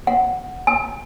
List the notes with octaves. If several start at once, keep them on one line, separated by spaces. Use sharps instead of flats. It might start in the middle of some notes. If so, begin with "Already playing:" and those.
F#5
G#5